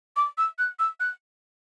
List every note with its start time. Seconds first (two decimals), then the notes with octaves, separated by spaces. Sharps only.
0.16 D6
0.38 E6
0.59 F#6
0.79 E6
1.00 F#6